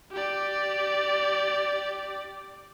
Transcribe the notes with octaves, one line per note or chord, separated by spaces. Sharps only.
G4 D5